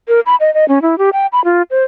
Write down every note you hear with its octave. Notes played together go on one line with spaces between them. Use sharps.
A#4
B5
D#5
D#5
C#4
E4
G4
G5
B5
F4
C5